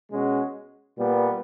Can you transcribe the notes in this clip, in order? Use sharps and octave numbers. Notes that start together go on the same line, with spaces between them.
B2 G#3 C#4 F#4
A#2 G3 B3